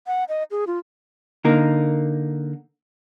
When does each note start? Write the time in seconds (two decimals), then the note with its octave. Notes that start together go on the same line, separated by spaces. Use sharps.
0.07 F#5
0.29 D#5
0.51 G#4
0.67 F4
1.45 D3 A#3 D#4 A#4